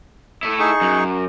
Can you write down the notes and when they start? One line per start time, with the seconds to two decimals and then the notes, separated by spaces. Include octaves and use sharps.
0.43 A3 E4
0.59 D#4 G#4 C#6
0.81 F#2